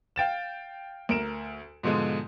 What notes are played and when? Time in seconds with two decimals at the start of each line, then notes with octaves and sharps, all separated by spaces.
0.16 F5 G5 A6 E7
1.09 D2 A#4 D7 E7
1.83 G#2 B2 D3 F3 G#3